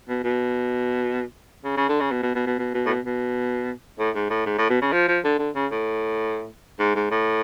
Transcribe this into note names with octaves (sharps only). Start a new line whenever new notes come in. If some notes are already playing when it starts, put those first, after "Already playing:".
B2
B2
C#3
C#3
D3
C#3
B2
B2
B2
B2
B2
B2
A2
B2
B2
A2
G#2
A2
G#2
A2
B2
C#3
F3
F3
D3
D3
C#3
A2
G#2
G#2
A2